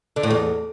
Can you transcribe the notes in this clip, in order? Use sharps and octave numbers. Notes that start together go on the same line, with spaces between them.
D3
A2
E2